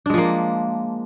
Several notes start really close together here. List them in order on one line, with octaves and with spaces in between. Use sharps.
D4 G#3 F3 A#3